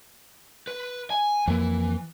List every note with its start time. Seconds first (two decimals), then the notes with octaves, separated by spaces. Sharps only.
0.67 B4
1.10 G#5
1.47 F2 E3 A#3